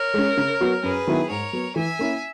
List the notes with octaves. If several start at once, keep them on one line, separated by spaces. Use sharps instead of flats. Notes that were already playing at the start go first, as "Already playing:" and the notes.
Already playing: A#4 C#5
G#3 C#4
C#3
F#3 B3 F#4
F#2 G#4 B4
D#3 F#3 B3 E4
G#2 A#4 C#5
F#3 B3
E3 E5 G#5
A#3 C#4 E4